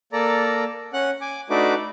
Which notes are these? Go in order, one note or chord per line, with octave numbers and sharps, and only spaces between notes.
A#3 A4 D5 A#5
C#4 F#5 F#6
G#5 D6
A3 D4 D#4 F#4 B4 D6